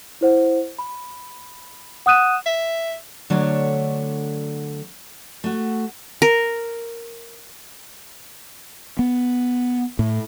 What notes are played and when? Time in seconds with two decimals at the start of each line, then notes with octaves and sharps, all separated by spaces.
0.21 E4 C5 F#5
0.79 B5
2.06 F#5 D#6 F#6 D#7 E7
2.46 E5
3.30 D3 F#3 A3 D4 C#5
5.44 A3 F#4
6.22 A#4
8.99 B3
9.99 A2